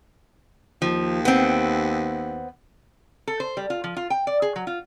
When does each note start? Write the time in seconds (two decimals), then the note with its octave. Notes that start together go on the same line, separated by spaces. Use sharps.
0.82 D#2 F3
1.25 B3 C4
3.27 A4
3.40 C5
3.57 G3
3.70 F4
3.84 F3
3.97 F4
4.10 G5
4.27 D5
4.42 G#4
4.56 F#3
4.67 F4